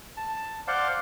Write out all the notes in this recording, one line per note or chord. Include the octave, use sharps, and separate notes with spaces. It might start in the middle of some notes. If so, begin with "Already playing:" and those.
A5
C5 D5 F5 F#5 C6